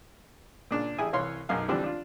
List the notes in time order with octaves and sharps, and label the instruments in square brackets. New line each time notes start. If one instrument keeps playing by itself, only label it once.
[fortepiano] A#2 C#3 D4
A1 E4 G4 G#4 G#5 D#6
C2 E3 C#5 F5 C6
B1 F#2 D#4 F5 G#5
D3 E3 F3 G3 C4 D4
D4 F4